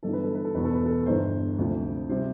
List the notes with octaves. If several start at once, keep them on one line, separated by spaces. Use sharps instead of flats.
G1 G2 E3 A4
B4
A4
B4
A4
E1 E2 B2 B4
A4
B4
A4
G1 G2 E3 C5
D2 C3 F3
C3 G3 C5